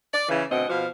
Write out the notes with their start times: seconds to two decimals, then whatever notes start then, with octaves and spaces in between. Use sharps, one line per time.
0.14 D5
0.29 C#3 E3
0.52 D2 B2 C4 D#5
0.69 B2 F3 F#4 F5